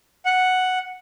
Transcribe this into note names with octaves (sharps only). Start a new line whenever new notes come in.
F#5